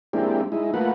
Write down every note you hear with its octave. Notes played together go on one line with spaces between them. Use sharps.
G#3 A#3 C4 D4 E4 G4
G#3 D#4 E4
A3 A#3 F4 B4 F#5